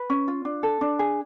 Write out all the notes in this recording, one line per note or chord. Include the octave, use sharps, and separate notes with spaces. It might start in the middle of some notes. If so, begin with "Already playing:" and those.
Already playing: B4
C#4
F4
D4
A4
D4
G#4